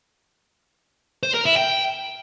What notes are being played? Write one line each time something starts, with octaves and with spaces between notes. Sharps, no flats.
C5
A#4
E4
G5